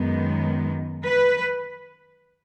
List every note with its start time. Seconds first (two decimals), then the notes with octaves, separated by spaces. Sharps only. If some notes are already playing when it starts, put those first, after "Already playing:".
Already playing: F#2 D#3 G#3 B3
1.04 B4